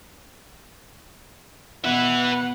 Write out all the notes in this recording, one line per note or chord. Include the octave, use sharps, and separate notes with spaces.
B2 B4 E5 F#5